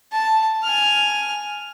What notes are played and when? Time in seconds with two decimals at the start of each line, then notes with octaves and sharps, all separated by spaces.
0.12 A5
0.63 G#5 F6